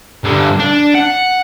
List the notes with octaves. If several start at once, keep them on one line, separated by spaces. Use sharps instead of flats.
G2 D3
D4
F#5